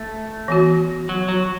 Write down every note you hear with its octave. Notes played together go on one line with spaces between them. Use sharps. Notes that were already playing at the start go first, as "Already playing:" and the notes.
Already playing: A3
E3 B3 F#4
F#3
F#3